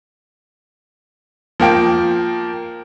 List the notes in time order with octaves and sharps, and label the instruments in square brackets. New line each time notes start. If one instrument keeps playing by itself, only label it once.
[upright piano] F3 A#3 G5 D7